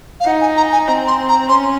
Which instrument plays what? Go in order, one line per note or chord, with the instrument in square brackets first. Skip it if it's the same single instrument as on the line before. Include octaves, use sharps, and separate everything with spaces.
[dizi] F5
[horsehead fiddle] D#4 [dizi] F#5
[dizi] G#5
A#5
G#5
[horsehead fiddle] C4 [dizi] A#5
[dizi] C6
A#5
[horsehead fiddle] C#4 [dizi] C6